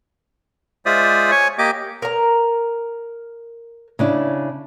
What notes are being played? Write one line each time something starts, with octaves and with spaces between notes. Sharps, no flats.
G#3 F4 C5 D5 E5 D#6
C#5 G#5 C#6
A#3 G4 D#5 D6
A#4 A#5
C#3 D4 E4